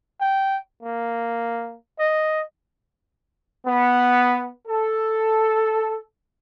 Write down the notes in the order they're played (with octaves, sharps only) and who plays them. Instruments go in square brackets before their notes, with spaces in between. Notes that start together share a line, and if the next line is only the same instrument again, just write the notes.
[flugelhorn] G5
A#3
D#5
[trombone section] B3
A4